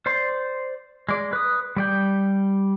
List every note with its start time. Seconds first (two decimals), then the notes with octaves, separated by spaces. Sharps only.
0.06 C5 D5 C6
1.09 G#3 D5
1.33 B4 D#6
1.76 G3 D5 G5